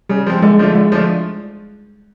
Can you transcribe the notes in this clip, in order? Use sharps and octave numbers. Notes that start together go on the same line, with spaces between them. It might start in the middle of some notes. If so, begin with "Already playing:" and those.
C#3 G3
F3 G#3 C4
D3 G#3
F3 A3 D4 F4
D3 G#3
F3 A3 D4 F4